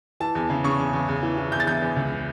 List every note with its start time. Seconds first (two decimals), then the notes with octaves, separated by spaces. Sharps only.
0.20 E3 A5
0.35 E2
0.50 C#3
0.64 C#3 C#6
0.79 E2
0.94 E2
1.08 E2
1.23 E3
1.38 E3
1.52 E2 G6
1.60 A6
1.67 E2 G6
1.82 E2
1.96 C#2